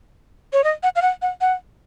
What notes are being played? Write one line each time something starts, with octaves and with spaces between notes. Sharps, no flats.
C#5
D#5
F#5
F5
F#5
F#5
F#5